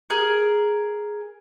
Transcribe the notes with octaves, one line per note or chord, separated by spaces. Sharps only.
G#4 A#4